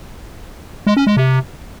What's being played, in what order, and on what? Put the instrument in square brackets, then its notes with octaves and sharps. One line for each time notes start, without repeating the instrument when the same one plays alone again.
[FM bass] G#3
C#4
G#3
C3